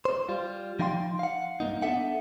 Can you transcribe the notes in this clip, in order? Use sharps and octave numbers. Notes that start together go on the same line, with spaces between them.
C5
G3 F4
F3 D#4 F5 G5 B5 C6
F5 F#5
G2 C3 A#3 D#4
B3 D4 A4 E5 F#5